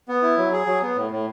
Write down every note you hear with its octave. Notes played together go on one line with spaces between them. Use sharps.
B3
E4
F#3
G#4
F#3
B3
A2
A2